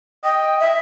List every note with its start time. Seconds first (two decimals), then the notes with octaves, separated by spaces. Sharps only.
0.24 D#5 G5
0.60 E5